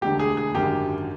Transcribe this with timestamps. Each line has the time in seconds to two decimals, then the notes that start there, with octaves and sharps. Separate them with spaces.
0.01 E1 D2 D3 G4
0.19 G#4
0.37 G#4
0.54 G#1 F#2 D3 G4